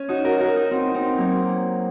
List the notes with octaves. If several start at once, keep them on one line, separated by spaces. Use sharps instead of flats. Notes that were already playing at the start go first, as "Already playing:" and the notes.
Already playing: C#4
D#4 F#4
F#4 A#4
F#4 A#4
D#4 F#4
C4 D#4
C4 D#4
F#3 A#3